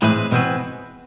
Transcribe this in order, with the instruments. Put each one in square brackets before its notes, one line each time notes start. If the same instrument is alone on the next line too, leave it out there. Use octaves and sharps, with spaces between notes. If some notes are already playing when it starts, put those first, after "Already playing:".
[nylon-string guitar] A2 [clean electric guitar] E3 G#3 C4 G#4 B4
[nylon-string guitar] B2 [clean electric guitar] E3 G#3 C4 G#4 B4